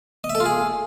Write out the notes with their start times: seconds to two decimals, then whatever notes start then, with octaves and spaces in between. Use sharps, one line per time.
0.24 D#5
0.29 E5
0.35 A4
0.40 F4
0.46 G#4